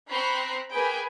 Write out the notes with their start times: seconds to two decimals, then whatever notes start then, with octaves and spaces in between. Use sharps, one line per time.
0.10 C4 A#5 B5 C#6 F#6 C7
0.72 A#3 G#4 B4 G5 G#5